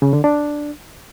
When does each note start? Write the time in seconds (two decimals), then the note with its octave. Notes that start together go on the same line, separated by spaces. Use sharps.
0.02 C#3
0.13 D3
0.24 D4